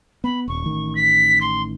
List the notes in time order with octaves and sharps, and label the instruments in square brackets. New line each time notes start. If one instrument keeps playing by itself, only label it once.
[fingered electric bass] B3 [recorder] B5
[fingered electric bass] D#1 [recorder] C#6
[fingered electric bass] A1 D#3
[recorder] B6
C6